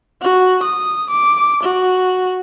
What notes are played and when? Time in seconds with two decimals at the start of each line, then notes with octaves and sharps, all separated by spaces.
0.22 F#4
0.63 D#6
1.11 D6
1.64 F#4